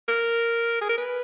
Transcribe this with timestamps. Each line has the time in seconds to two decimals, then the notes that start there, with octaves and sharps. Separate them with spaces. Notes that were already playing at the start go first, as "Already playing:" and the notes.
0.08 A#4
0.81 G#4
0.89 A#4
0.98 B4